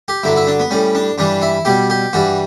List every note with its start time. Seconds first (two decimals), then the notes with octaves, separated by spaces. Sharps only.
0.08 G4
0.23 G2 D3 F#3 E4
0.36 E4
0.47 D4
0.60 B3
0.71 A2 G3 C#4
0.95 D4
1.18 G2 E3 G3 D4
1.42 E4
1.65 B2 G3 G4
1.90 G4
2.13 G2 E3 G3 F#4